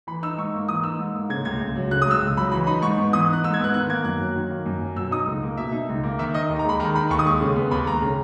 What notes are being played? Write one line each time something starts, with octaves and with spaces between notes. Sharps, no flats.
E3 B5
D#4 E6
G#2 C#6
A#3
E3 D#6
D#4 E6
G#2
A#3
C#3 G#6
C#2 G#6
C#2
F#3
C#3 F#6
D#6
C#2 E6
C#2
F#3 B5
E3 B5
D#4 B5
G#2 C#6
B3
E3 D#6
D#4 F#6
G#2 E6
G#6
B3 F#6
D#3 F#6
A#3 G#6
F#2 F#6
F#3
D#3
A#3
F#2
F#3
B2 E6
D#4 D#6
C#2
A#3
B2 E5
D#4
C#2
A#3
D#3 E5
D#4 D#5
D#2
A#5
G#3 B5
D#3 A#5
D#4 B5
D#2 C#6
D#6
G#3 C#6
C#3
B3
D#2 B5
G#3 A#5
C#3